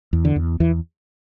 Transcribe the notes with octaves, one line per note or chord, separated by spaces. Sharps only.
E2
D3
E2
E2 E3